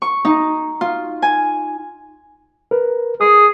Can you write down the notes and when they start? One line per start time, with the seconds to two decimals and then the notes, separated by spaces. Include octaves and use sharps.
0.02 C#6
0.25 D#4
0.81 F4
1.22 G#5
2.71 A#4 B4
3.21 G#4 D#6